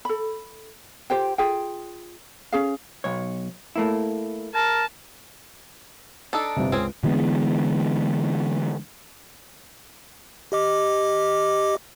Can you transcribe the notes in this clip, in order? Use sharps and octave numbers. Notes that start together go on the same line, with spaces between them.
A4 B5
F4 G4 C5 G5
F4 G#4 G5
C#4 G#4 F5
B1 C#5
A3 A#3 E4
A#4 A5
D4 D#4 A4
G1 C3
C#2 C4 C#4 G#4
D3 E3 G#3 B3
G4 D#5 D6